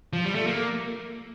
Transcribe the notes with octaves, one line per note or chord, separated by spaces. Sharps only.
F3
G3
A3
A#3